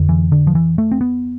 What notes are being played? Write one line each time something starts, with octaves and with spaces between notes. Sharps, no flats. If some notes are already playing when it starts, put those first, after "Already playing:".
Already playing: F2 D3
E3
D3
F3
E3
A3
C4
B3